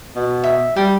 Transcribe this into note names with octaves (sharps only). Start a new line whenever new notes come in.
B2
E5
G3 G5